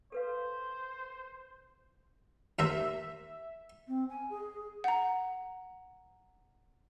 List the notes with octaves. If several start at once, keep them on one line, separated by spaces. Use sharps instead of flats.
A4 B4 C5 F5
D#2 A#4 C5 E5
C4
G#5
G#4
F#5 A#5